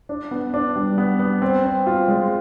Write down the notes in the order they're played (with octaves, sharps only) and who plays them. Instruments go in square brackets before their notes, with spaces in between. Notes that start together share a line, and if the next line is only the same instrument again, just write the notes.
[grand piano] D4
B3
D4
G3
B3
B3
C4
C4
F4
G#3